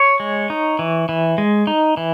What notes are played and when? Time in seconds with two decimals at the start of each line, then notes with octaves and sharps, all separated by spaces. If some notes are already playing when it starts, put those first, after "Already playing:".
Already playing: C#5
0.20 G#3
0.50 D#4
0.79 E3
1.09 E3
1.38 G#3
1.67 D#4
1.97 E3